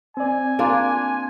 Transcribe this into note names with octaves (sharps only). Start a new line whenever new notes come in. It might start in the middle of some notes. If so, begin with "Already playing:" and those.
C4 D5 G#5
A#3 D4 F4